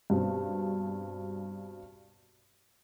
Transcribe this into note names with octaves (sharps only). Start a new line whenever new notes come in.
G2 B2 C4